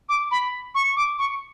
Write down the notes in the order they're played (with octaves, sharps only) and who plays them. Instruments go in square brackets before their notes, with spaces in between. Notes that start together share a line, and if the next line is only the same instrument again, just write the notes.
[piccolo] D6
B5
C#6
D6
C#6